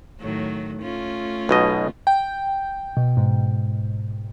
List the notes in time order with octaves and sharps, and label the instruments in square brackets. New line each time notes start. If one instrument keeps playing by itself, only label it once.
[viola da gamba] A2 D#3 F#3
A3 C#4 F4
[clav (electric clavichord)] B1 B2 D#5
[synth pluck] G5
B2
G#2